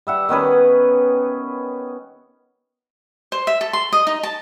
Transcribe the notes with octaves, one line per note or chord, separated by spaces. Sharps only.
G3 E5 F#5
D#3 B3 C#4 B4
C5
E5
A4
C6
D#5
D#4
A5